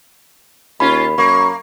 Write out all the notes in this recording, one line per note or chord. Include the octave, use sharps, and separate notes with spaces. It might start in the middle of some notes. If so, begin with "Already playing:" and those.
D#2 C#4 F4 B5
F#2 A#3 C#6